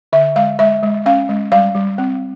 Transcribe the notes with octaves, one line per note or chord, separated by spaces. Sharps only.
D3 E5
G#3 F5
G#3 E5
G#3
C#4 F5
G#3
G3 F5
G3
C4